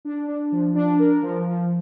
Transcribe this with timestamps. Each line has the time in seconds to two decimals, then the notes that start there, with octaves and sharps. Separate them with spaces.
0.05 D4
0.28 D4
0.52 F3
0.75 D4
0.99 A#4
1.22 F3
1.47 F3